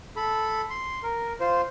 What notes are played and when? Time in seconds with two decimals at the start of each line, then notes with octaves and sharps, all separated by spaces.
0.16 A4 B5
0.70 C6
1.03 A#4
1.40 F4 C5